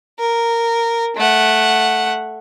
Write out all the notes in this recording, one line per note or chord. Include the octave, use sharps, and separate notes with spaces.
A#4
A3 F#5